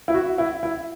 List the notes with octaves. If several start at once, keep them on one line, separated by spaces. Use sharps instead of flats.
E4
F#4
E4
E4